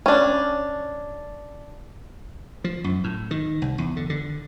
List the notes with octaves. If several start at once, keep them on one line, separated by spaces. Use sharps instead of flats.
C#4 D4
F3
F#2
A2
D#3
C2
E2
D3
D3